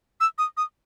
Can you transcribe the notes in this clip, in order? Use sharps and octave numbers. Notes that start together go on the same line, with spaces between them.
E6
D#6
D#6